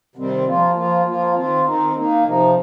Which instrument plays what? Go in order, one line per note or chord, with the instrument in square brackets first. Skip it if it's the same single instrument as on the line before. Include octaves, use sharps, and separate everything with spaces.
[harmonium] C3 D#3 G3 C4
F3 A#3 F4
F3 A#3 F4
F3 A#3 F4
D#3 C4 F4
D#3 C4 D#4
D#3 A#3 D#4
C3 F3 D#4